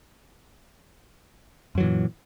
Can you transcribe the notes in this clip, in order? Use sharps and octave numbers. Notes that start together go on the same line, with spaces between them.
F#2 A#2 E3 F#3